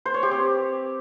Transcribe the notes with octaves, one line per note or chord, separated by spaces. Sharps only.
C5
C#5
G4
C4